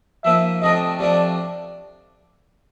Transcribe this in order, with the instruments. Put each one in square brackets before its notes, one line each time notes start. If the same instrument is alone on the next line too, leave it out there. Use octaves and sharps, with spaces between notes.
[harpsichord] F3 A#3 D#4 [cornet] E5
[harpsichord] C3 F3 A3 D4 [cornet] D#5
[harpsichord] C3 F3 A3 D4 [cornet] D5